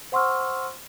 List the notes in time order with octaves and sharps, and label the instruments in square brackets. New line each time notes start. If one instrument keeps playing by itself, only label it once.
[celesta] C5 F#5 C6 C#6 E6 F6